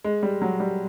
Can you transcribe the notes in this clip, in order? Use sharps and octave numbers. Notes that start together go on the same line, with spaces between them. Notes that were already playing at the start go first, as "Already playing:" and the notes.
G#3
G3
F#3
G3